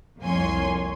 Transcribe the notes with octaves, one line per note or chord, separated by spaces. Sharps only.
C2 F2 A#3 C#5 G#5 C6